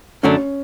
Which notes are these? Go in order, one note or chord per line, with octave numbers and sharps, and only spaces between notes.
F#2 D3 F#3 A3 C#4 D4